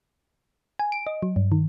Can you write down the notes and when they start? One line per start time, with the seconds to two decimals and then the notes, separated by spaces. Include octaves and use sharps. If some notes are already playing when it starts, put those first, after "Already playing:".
0.79 G#5
0.92 D7
1.07 D#5
1.23 F#3
1.36 G2
1.52 D#3